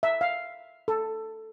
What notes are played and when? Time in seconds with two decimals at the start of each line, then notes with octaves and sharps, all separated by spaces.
0.03 E5
0.21 F5
0.88 A4